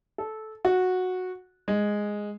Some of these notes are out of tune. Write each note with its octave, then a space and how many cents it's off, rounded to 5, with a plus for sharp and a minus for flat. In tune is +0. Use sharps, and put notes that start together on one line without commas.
A4 -15
F#4 -10
G#3 -5